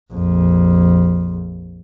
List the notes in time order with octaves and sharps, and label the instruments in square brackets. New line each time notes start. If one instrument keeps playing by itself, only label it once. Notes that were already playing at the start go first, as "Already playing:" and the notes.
[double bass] A#1 F2